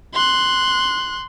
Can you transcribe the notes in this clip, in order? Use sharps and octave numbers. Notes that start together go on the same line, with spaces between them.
C6 F#6